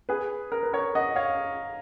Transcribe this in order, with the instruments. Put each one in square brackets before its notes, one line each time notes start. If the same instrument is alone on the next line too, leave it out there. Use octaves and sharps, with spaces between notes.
[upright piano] G#4 B4
A#4
B4
A#4 C#5
D#5 F#5
C#5 F5